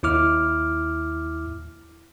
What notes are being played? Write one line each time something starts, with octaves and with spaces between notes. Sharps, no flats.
D#2 E4 D6 F6